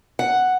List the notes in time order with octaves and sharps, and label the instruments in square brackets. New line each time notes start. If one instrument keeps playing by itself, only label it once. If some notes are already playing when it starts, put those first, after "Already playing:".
[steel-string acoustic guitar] F#5